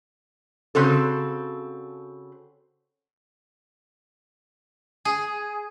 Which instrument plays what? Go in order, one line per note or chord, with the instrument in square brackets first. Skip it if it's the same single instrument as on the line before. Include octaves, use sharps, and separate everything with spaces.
[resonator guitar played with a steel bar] C#3 C4 F#4 A4
[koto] G#4